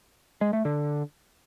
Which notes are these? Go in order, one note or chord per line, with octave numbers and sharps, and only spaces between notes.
G#3
A3
D3